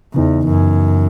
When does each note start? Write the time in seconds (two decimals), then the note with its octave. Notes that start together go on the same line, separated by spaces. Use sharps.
0.14 E2 C#3 E3 B3 D#4
0.45 F#2